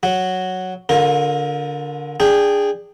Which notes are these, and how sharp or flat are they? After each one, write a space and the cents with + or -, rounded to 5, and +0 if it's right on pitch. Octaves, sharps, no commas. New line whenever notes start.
F#3 +0 F#4 +0
D3 -15 F4 +35 A#4 +0
D4 +0 G#4 -15 G5 +0